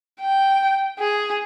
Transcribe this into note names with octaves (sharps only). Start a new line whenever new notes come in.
G5
G#4